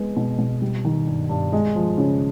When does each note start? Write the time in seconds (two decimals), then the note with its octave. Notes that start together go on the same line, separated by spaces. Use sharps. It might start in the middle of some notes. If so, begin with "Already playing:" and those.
Already playing: G#3 B3
0.17 B2
0.38 B2
0.62 G3
0.85 D#3
1.07 G2
1.30 G2
1.53 G#3
1.75 F3
1.98 C#3